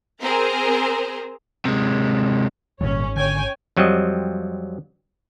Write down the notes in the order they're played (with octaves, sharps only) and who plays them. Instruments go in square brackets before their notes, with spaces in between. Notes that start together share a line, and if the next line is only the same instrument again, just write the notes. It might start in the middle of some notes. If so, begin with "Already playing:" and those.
[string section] C4 G#4 A#4 C5 A#5
[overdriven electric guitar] C3 G#3
[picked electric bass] D#1 G#1 [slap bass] A#2 D#3 G3 [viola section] C#4 C#5
[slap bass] D3 [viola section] C#5 G5 G#5
[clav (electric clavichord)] F2 F#3 G3 C4 D#5